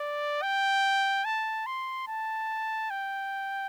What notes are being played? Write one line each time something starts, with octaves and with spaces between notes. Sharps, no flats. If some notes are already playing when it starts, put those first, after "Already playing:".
Already playing: D5
G5
A5
C6
A5
G5